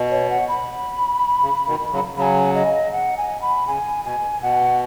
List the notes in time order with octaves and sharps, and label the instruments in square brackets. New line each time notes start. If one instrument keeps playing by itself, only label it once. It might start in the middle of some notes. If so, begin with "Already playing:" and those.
Already playing: [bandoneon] B2
[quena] C#5
F#5
B5
[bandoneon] C#3
B2 D#3
C#3 F#3
[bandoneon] C#3 F#3 [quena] G#5 B5
[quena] D#5
F#5
G#5
B5
[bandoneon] C#3 [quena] G#5
[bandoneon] B2 [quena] G#5
[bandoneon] B2 [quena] F#5